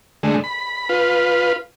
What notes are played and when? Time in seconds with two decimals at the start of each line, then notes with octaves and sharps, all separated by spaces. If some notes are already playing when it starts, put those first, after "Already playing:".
0.23 D3 G#3 A3
0.44 B5
0.89 F4 B4